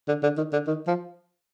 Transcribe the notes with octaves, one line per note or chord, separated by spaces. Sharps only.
D3
D3
D#3
D3
D#3
F3